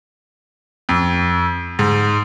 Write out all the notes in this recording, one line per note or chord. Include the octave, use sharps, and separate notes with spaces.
F2
G#2